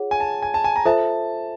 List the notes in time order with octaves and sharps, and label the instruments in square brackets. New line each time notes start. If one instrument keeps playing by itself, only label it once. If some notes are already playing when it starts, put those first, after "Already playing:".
Already playing: [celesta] F4 G#4 C#5 F#5
[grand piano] G#5
A5
G#5
A5
G#5
A#5
[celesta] F4 A4 C5 E5 [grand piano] A5